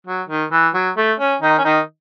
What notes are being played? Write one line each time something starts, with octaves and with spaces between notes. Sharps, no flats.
F#3
D#3
E3
F#3
A3
C#4
D#3 D#4
C#4
D#3 D#4